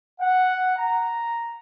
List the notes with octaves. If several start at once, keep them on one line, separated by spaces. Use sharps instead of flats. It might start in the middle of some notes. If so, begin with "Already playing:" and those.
F#5
A#5